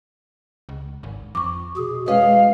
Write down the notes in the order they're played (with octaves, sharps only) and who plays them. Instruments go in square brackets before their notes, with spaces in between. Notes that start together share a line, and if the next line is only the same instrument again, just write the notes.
[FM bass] C#2
G#1
[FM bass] F2 [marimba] C#6 D6
[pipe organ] B2 G#4
[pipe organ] G#3 [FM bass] C#4 [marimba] B4 [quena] F5